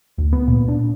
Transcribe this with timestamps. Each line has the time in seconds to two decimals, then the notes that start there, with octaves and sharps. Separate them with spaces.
0.18 D2
0.33 B3
0.47 A#2
0.68 D4